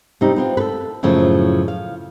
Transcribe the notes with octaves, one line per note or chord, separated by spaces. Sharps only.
C3 G3 D#4
B3 C4 F4
A4 B4
F#2 A2 C#3 F3
F5